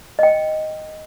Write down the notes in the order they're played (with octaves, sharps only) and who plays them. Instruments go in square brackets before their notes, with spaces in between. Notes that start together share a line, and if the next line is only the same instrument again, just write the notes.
[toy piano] D#5 G5